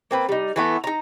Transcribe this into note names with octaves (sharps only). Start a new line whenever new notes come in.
A#3 C4 B4
G3 D#4
E3 A3 B3
D#4 A#5